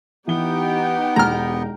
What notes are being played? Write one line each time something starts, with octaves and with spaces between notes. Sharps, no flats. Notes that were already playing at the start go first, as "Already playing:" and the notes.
E3 B3 D#4 G4 G5 G7
E1 A#5 F6